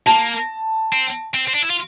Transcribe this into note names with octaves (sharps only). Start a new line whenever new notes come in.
A#3 A5
C4
C4
C4
D4
E4
F4